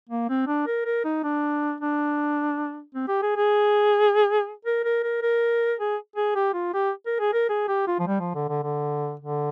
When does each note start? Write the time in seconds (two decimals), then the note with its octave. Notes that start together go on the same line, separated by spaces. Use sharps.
0.09 A#3
0.29 C4
0.47 D4
0.67 A#4
0.85 A#4
1.05 D#4
1.24 D4
1.81 D4
2.95 C4
3.08 G4
3.23 G#4
3.37 G#4
4.65 A#4
4.84 A#4
5.03 A#4
5.22 A#4
5.79 G#4
6.16 G#4
6.35 G4
6.54 F4
6.74 G4
7.06 A#4
7.20 G#4
7.33 A#4
7.49 G#4
7.68 G4
7.88 F4
7.99 F3
8.07 G3
8.20 F3
8.35 D3
8.49 D3
8.63 D3
9.20 D3